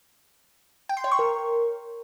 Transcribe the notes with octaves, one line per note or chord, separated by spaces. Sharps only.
G5
C6
C#5
C#6
A#4